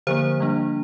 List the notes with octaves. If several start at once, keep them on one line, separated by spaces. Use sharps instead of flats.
D3 F3 A#3 C5
G3 A#3 D4